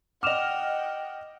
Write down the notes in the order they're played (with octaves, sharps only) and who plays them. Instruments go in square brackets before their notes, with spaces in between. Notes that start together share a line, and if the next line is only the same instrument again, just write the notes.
[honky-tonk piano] D#5 F6 [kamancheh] F#5 G5 [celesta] D6 E7 F7